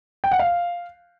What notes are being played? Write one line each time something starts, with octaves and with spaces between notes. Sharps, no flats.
G5
F#5
F5